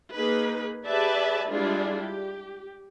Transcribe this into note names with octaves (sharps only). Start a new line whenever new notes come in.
A#3 D#4 G#4 B4
G4 G#4 B4 D5 E5 A5
G3 G#3 D4 E4 F4 G#4
G4